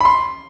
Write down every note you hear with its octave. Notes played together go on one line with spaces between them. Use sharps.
B5
C6